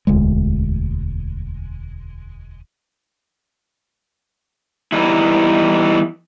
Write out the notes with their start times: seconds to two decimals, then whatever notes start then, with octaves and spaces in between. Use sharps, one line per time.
0.07 E1 D2 G#3
4.92 E3 G3 B3 D#4 E4